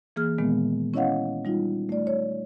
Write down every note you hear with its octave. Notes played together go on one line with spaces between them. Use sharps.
E3 A#3 G#4 F6
A#2 D#3 G#3 B3
C#4 E4 C#5 D#5 F5 F#5
G3 D#4 F4
A3 D5
C#5